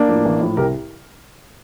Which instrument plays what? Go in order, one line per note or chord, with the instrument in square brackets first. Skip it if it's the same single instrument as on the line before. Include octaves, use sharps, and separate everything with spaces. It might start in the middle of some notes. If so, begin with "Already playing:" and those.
Already playing: [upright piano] A#3 D4
A2 F3
A1
A2 F3
C2 G4 A#4